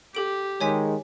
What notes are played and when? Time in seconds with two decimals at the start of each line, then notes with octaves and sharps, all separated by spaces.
0.15 G4 A4 D7
0.61 D#3 G#3 C#5 G#5 B6